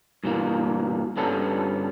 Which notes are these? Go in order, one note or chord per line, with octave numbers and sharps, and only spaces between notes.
G2 B2 E3 A#3
G2 G3 B3 C#4 A4